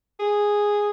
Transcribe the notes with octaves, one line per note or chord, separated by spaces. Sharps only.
G#4